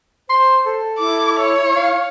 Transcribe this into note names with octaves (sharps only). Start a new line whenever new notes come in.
C5 C6
A4
E4 D6
C#5
F5